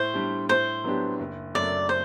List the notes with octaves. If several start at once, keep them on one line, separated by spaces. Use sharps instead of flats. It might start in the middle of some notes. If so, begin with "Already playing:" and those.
Already playing: A2 C5
G3 D4 G4
A2 C5
F#3 B3 D4 G4
F#1
F#2 F#3 A3 D5
C5